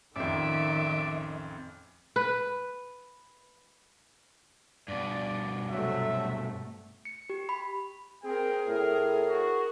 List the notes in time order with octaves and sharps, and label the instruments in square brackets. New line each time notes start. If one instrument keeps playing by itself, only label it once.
[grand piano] A1 F2 [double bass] D#3 [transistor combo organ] D5 [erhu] E5
[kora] B4
[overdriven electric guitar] G2 B2 [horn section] D5
[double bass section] C3 A3 [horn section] F#3 E5
[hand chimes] C#7
G4
B5
[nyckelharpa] C4 A#4 [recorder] G#4 [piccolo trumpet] G5
[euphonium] A2 [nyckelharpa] A#4 [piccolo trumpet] F6
[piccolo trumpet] F#4